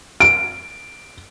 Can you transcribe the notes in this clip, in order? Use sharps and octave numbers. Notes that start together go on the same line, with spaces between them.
D7